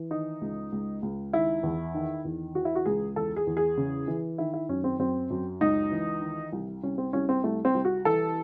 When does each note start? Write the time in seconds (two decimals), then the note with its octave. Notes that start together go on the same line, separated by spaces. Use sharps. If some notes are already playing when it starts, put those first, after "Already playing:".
Already playing: E3
0.10 D#3 D#4
0.41 C#2
0.72 C#2
1.02 C#2
1.33 D#3 E4
1.63 E2
1.94 D#3
2.25 E2
2.55 E3 F#4
2.65 E4
2.75 F#4
2.86 C#2 G#4
3.16 E2 A4
3.36 G#4
3.47 E2
3.57 G#4
3.77 C#3
4.08 E3
4.38 D#3 E4
4.54 E4
4.69 F#2 C#4
4.84 C4
4.99 F#2 C4
5.30 F#2
5.61 C#2 D#4
5.91 E3
6.22 D#3
6.53 C2
6.83 C2 C#4
6.98 C4
7.13 C2 C#4
7.29 C4
7.44 C2 A3
7.65 C4
7.75 C2
7.85 F#4
8.05 E3 A4